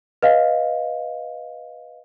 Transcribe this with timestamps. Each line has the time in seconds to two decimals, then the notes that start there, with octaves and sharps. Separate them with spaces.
0.23 B4 D#5 F5